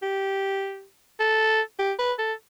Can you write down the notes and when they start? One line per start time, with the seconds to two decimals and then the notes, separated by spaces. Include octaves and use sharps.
0.03 G4
1.20 A4
1.79 G4
1.99 B4
2.19 A4